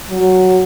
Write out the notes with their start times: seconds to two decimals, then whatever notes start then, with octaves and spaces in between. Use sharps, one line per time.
0.10 F#3